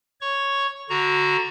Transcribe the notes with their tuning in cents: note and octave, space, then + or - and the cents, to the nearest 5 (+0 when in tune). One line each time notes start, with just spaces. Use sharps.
C#5 +0 C#6 +0
D3 +0 F#4 +0 A#5 +0